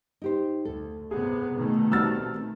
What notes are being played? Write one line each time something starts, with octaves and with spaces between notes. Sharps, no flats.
D#4 G4 C5
D2 A4
G2 C3 B3 G#4
B2 D#3 A3
G3 C4 F#4 E6 F6 A6